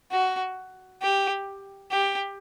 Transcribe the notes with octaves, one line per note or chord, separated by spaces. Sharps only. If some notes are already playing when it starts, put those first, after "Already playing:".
F#4
G4
G4